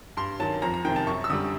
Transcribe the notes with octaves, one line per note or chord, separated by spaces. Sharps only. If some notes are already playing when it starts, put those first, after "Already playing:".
G2 C6
D#3 F#3 A5
F2 A#5
A#5
C3 D#3 G5
A5
F#2 C#6
E6
D3 G3 D#6